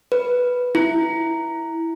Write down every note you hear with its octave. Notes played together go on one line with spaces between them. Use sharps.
B4
E4